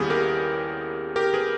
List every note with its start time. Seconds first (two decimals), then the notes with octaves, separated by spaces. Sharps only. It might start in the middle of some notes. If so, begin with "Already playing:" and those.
Already playing: D#2 C#3 G3 B3 E4 G4 G#4
0.10 G4 A#4
1.16 G4 A#4
1.34 G#4 B4